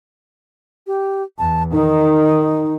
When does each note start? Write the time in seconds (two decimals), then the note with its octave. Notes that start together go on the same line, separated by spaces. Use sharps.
0.87 G4
1.39 E2 A5
1.72 D#3 D#4